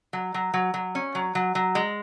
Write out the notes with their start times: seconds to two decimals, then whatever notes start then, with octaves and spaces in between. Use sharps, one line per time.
0.13 F#3
0.34 F#3
0.54 F#3
0.74 F#3
0.95 C#4
1.15 F#3
1.35 F#3
1.55 F#3
1.75 G#3